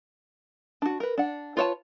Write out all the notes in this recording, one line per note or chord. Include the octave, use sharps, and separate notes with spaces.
D4 F#4
A#4 B4
D4 F#5
F4 B4 C#5 F#5 A5